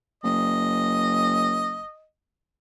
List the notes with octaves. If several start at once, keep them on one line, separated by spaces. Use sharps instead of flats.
F#1 D#5